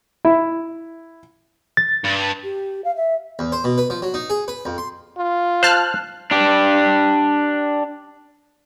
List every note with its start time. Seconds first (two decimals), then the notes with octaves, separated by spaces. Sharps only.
0.25 E4
1.77 A6
2.05 G2
2.43 G4
2.84 F5
2.96 E5
3.39 E2
3.52 C5
3.64 B2
3.78 B4
3.90 F3
4.02 F#3
4.14 D#4
4.30 G#4
4.48 B4
4.65 F2
4.78 C6
5.18 F4
5.63 C5 A5 F6 F#6
6.31 D4 G4